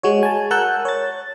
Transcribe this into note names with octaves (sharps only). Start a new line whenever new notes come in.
G#3 F#4 C#5
G#5 A5
A#4 F#5 A5 E6 F#6 G6
C#5 A6